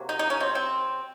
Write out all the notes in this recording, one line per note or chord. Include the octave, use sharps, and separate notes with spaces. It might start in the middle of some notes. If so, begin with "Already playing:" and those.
Already playing: C3 F#3 A#3
D#4
D#4
C#4
C4
C4